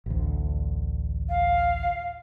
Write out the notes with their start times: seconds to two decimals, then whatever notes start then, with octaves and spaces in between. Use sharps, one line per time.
0.06 A1 D2
1.29 F5